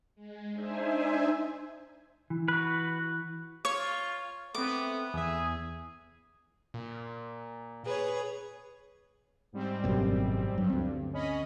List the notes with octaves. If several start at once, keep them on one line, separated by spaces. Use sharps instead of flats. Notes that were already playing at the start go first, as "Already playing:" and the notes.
G#3
D4 D#4 C5 E5 G#5
E3
F#4 B4
F4 C#5 C#6
A3 B3 C4 D6
E2 G#4 E5
A#2
G#4 B4 C#5
G#2 G3 C4
G#1 F#2 B2
G2 F#3
D2 C4
C#4 D#5 B5